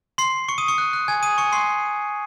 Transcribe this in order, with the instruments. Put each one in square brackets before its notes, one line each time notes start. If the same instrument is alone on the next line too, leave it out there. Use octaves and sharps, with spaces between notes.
[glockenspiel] C6 C7
C#6 C#7
D#6 D#7
C#6 C#7
F#6
F#6
G#5 G#6
D#6 D#7
C#6 C#7
C6 C7